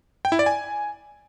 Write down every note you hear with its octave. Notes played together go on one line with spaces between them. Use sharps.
G5
E4
D5
G#5